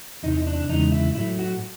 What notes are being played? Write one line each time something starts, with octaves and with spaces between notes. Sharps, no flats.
E2 C3 E3 D#4
D4
E2 C#3 E3 G#3 D#4
E4
A2 F#3 A3 E4
F#4